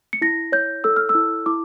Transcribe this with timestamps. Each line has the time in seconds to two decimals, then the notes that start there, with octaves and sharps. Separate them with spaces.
0.13 C#7
0.22 E4 A#6
0.52 C#5 G6
0.84 A4 E6
0.97 F6
1.09 E6
1.15 E4
1.46 E4 D6